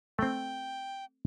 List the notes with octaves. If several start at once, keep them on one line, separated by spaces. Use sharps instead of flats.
A3 C4 G5